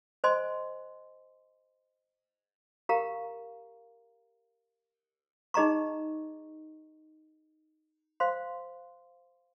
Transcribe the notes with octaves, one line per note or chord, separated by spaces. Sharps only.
C5 D#5 G#5 C6
G4 A#4 F5 A#5
D#4 G#4 D#5 A#5 C#6
C5 F5 C6